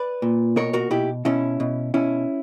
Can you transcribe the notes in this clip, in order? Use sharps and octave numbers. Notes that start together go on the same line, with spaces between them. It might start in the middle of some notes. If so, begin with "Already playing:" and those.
Already playing: B4 D5
A#2
B2 A#4 C#5
F#4 A#4
B2 E4 G4
B2 C#4 E4
B2
B2 C#4 E4